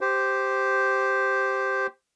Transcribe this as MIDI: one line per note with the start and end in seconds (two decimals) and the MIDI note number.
0.01 1.87 67
0.01 1.87 72